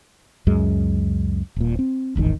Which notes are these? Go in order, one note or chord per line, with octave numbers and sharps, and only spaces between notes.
C#2 F#2 G#3
D#1 A#2
C4
D1 G#1 E2 D#3